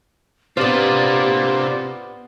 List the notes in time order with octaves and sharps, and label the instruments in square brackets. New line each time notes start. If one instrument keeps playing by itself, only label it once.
[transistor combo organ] C3 C4 D4 [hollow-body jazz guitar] B3 C5 [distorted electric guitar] F4 D5 [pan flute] G4